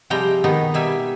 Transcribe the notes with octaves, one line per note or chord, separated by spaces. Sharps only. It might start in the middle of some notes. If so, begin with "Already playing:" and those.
C3 F3 G3 G#3 G5 A#5
B2 D#3 B3 D#4
B2 G3 D#4 E5 G#5